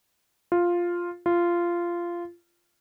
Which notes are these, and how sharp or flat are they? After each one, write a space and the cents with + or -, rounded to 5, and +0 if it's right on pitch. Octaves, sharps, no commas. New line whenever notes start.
F4 +0
F4 -15